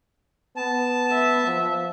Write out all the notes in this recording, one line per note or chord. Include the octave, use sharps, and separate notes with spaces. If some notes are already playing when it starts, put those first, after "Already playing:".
B3 A5
E5
F3